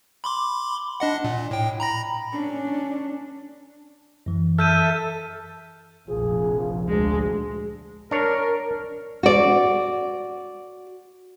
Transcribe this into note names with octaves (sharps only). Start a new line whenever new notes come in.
B5 C6 D6
D4 D#5 F#5
A#2
A2 G5
A#5 B5 A#6
C#4 D4
F#2 E3
A4 E5 F6 G6 D#7
F1 A#1 F3 G#4
F3
D2 G#3 D4
D4 A#4 C#5
F#4 D5